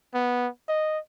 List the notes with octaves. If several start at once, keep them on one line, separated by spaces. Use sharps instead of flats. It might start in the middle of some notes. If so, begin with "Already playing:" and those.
B3
D#5